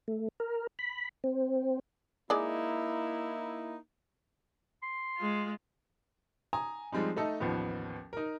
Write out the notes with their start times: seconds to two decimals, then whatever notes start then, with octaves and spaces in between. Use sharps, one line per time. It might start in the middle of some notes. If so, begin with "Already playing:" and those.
0.08 A3
0.40 A#4
0.79 B5
1.24 C4
2.30 G#3 A#3 D#4 E4 D5
4.82 C6
5.17 G#3 F4
6.53 G#5 A#5 D#6
6.92 F3 G3 G#3 C4 D#4
7.17 A3 D#4 A4 D#5
7.40 A1 D#2 F3 B3
8.13 D#4 A#4